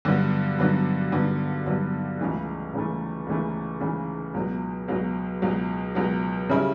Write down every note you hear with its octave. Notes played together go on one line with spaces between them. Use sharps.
G2 D3 F#3 B3
G2 D3 F#3 B3
G2 D3 F#3 B3
G2 D3 F#3 B3
C#2 C#3 E3 A3
C#2 C#3 E3 A3
C#2 C#3 E3 A3
C#2 C#3 E3 A3
C#2 B2 F#3
C#2 B2 F#3
C#2 B2 F#3
C#2 B2 F#3
C#3 G3 C#4 E4